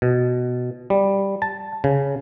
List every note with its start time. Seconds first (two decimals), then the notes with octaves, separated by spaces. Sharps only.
0.02 B2
0.90 G3
1.42 A5
1.84 C#3